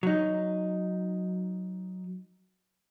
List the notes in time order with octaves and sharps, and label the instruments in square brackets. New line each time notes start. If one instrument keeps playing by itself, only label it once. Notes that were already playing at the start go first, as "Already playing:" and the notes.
[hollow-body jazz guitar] F#3 D#4